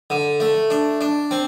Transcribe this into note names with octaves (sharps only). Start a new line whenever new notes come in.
D3
A3
D4
D4
C4